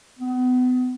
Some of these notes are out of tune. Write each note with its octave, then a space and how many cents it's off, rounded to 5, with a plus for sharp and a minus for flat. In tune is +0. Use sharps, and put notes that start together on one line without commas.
B3 +30